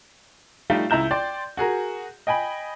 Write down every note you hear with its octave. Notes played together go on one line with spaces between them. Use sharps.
G3 A3 D#4 F4 G4
C#2 E4 A#5 G6 E7
D5 G5 C6
F#4 G#4 A#4
D#5 G5 G#5 B5